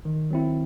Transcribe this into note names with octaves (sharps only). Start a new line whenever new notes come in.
D#3
F#3 C4 E4